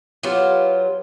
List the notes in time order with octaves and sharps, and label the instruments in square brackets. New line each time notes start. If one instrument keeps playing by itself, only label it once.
[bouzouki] F#3 B3 F4 G4